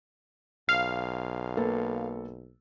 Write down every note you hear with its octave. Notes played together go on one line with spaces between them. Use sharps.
B1 F5
A#3 A4 B4